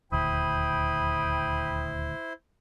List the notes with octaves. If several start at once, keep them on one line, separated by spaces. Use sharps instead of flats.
D#1 D2 E4 C5 G5 B5 D#6